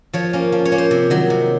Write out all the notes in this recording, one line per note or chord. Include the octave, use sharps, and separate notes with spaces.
F3 C#5
A#3 C#4
F3
C#5
A#3 C#4
C5
C3
D#3 F#3
C3